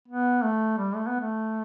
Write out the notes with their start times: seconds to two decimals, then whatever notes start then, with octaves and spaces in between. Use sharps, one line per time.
0.08 B3
0.43 A3
0.78 G3
0.95 A3
1.07 B3
1.20 A3